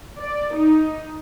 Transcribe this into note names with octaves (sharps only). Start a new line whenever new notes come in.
D5
D#4